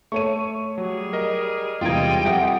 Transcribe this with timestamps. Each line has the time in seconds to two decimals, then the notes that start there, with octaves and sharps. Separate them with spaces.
0.12 A3 C#5 C#6 D#7
0.78 F#3 G3 G#4
1.13 A#4 D#5
1.81 E1 C3 E3 G3 F4 D#5 G5 G#6
2.25 F2 F3 G4 E5 F#5